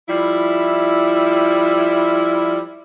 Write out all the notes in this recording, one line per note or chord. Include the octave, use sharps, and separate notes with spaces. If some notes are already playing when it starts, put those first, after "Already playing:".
F3 G3 E4